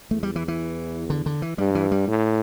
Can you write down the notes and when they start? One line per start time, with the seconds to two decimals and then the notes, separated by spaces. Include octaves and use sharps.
0.11 E2 A3
0.23 G3
0.36 E3
0.48 E3
1.10 D3
1.26 D3
1.42 E3
1.58 G2 G3
1.75 E3
1.91 G3
2.07 A2